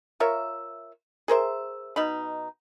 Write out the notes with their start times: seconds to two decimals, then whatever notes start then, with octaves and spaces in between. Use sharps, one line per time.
0.20 F4 A#4 C#5 E5
1.28 G#4 A#4 C5 E5
1.96 B2 D#4 B5